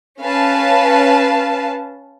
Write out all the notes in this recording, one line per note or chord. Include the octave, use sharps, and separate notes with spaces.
C#4 B4 F5 A5